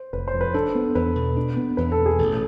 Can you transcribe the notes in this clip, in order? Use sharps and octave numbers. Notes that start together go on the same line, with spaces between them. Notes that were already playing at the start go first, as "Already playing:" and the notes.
Already playing: C5
F1 B4
C5
F2
B4
D4 A4
B3
E2 B4
B2
D4
B3
E2 B4
A4
B2
G#4
A1 A4